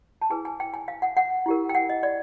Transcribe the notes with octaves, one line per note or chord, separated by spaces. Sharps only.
A5
E4 G#4 B4 G#5
G#5
G5
G#5
F5
F#5
F#5
E4 G4 A#4
G5
F#5
D#5
D5